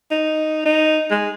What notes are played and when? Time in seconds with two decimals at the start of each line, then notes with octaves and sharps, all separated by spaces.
0.11 D#4
0.66 D#4
1.11 G#3